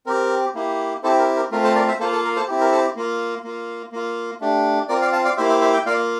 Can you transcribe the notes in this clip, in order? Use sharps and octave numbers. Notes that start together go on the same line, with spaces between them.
C4 G4 A#4
A#3 E4 G4
C4 E4 G4 A4 C5
A#4
A#4
A3 C4 F4 A#4
A4 C5
A#4 D5
C5 E5
A#3 F4 A4 C5
A4
A#4
A4 C5
C4 E4 G4
A#4
A4 C5
A#3 F4
A#3 F4
A#3 F4
A3 D4 G4
C4 F4 A#4 D5
D5 F5
F5 A5
D5 F5
A#3 E4 G4 C5 E5
C5 E5
C5 E5
E5 G5
A#3 F4 D5 F5